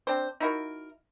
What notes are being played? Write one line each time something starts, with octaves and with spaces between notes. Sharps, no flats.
C4 D4 C5
D#4 E4 F#4 A#4